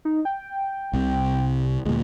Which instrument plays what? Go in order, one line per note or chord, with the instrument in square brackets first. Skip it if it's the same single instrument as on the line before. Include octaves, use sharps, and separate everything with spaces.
[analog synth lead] D#4
G5
[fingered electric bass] C2 C3
[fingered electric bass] D2 A#2 [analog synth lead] G#3